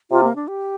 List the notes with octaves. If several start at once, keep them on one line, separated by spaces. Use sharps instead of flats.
C3 F4
A#3
D4
G4